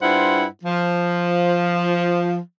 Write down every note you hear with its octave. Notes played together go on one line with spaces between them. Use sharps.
G2 E4 F4 C5 F#5
F3